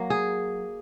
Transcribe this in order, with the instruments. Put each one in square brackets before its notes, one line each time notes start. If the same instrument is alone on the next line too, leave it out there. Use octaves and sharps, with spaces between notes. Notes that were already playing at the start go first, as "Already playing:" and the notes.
Already playing: [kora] F#3 A#3
G#4